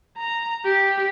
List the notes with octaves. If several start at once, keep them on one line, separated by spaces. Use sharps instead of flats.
A#5
G4